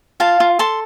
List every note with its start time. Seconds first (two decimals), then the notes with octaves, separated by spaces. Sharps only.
0.20 F4 F5 A5
0.40 F4
0.59 A4 A5 C6